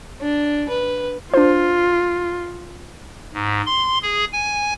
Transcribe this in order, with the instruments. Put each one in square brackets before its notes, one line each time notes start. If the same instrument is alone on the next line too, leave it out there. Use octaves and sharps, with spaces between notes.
[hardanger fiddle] D4
B4
[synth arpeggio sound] D4 C5 [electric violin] F4
[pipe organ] G#2
C6
G#4
G#5